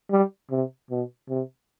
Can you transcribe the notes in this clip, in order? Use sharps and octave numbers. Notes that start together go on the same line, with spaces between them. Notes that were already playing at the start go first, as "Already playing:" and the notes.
G3
C3
B2
C3